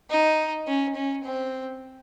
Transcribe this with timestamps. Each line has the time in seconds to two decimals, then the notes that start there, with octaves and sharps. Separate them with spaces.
0.10 D#4
0.67 C#4
0.95 C#4
1.24 C4